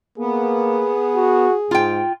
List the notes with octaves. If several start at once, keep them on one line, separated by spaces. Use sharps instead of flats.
A#3 B3 G#4
F#4
G#2 F4 G5